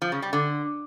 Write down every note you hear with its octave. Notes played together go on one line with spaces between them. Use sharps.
F3
C#3
G3
D3